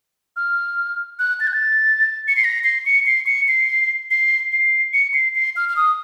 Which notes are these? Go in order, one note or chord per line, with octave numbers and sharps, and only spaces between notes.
F6
F#6
A6
F#6
A6
C#7
C7
A#6
C7
C#7
C7
C#7
C7
C7
C7
C#7
C7
C7
F6
F6
D#6